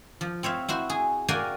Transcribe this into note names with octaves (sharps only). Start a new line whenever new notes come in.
F3
C4 C#5 E5 F5
E4 F#4 C5
G#4
F#4 A#4 D5 F5 G5 G#5